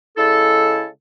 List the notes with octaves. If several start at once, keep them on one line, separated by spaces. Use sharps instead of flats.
C#3 G#3 E4 A4